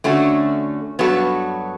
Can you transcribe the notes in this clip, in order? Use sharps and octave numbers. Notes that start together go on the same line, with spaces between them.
D3 A3 C#4 F#4
G2 F#3 B3 F#4 A4